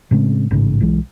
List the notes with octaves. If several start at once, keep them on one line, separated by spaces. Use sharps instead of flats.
A2 C#3 G#3 C4
A1 G#2 C#3
B1 E3 G#3